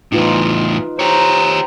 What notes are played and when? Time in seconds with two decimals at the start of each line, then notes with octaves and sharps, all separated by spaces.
0.12 E2 A2 D#4 F4 B4
0.99 G4 C5 C#5 A#5